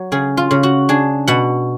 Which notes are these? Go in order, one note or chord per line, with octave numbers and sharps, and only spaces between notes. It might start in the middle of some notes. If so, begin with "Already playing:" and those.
Already playing: F#3
C#3 G#4
F4
C#3
F#4
D4 G#4
B2 F#5